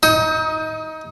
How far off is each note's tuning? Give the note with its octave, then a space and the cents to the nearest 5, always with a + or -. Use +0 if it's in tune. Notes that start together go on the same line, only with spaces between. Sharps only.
D#4 +20 D#6 +40